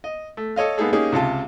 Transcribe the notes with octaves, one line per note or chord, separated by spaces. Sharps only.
D#5
A3
A4 C#5 D#5 F5
G#3 A#3 B3 D#4 G#4 A4
A#3 C#4 D#4 G4 G#4
C#2 C3 F4 A5